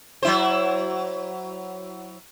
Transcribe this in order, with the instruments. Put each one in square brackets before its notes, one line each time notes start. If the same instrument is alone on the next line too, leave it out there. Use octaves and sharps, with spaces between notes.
[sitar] F#3 E4 C5